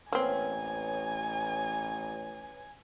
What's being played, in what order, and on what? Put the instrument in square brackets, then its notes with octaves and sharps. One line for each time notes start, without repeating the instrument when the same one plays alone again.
[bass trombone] A1 [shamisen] A#3 C4 [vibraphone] B4 C#5 [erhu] G#5